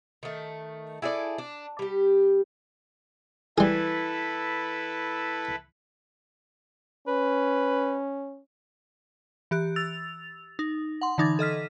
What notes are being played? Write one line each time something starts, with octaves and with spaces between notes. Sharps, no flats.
D#3 A3
E4 G#4 A4 D5
D4
G3 G4
E3 G3 E4 G#4 A4 B4
C#4 B4
E3 G4 F#6
E6 A6 F7
D#4
F#5 C6
D3 E3 D#4 D6 G#6 A6
A4 D#5 F6 B6